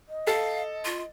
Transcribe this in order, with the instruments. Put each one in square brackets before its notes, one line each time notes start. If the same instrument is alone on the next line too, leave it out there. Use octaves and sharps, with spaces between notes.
[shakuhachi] D#5
[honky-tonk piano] A4 [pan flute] F5
[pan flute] F4